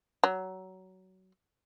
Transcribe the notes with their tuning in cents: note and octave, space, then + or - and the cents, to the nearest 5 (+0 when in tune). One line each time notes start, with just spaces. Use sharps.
F#3 +20